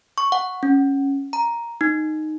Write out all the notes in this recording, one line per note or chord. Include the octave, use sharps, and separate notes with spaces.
C#6
F#5
C#4
A#5
D#4